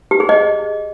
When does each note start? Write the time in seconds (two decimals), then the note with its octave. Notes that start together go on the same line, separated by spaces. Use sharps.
0.11 G4
0.20 G#4
0.29 D#5